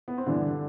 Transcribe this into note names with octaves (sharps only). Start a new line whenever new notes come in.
B3
C4
G2 D3 E3 D4